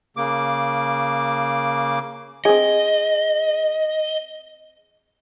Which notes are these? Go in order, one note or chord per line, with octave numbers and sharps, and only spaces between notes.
C#3 A#3 D6
C4 G#4 D#5